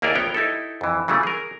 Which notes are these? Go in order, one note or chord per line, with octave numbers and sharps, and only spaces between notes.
D#2 A#3 E4 G#4 A#4 D5
A#1 B3 A#4 C#5 G5
D#4 E4 G4 A4
F2 E3
C#3 E3 F#3 G3 A3
G#4 A#4